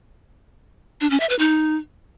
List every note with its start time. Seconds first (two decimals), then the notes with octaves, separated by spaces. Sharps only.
1.01 D4
1.10 C#4
1.20 E5
1.29 B4
1.39 D#4